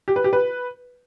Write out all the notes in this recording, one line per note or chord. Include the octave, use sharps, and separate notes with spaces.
G4
B4
G4
B4